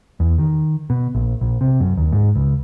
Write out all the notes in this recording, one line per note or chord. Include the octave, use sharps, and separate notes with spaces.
E2
D#3
B2
A#1
A#1
C3
F#2
D#2
G#2
C#2